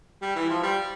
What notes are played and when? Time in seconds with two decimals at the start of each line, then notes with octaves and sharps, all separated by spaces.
0.22 G3
0.35 E3
0.49 F3
0.63 G3